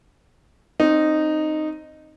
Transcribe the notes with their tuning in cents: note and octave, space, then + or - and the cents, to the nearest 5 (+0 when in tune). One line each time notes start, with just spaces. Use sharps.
C4 +20 D#4 -10